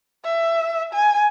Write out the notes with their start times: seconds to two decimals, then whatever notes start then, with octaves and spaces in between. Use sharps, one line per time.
0.24 E5
0.93 G#5